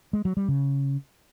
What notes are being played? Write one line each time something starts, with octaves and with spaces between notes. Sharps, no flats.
G#3
F#3
G3
C#3